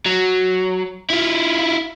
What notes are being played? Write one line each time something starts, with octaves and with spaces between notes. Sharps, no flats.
F#3
E4 F4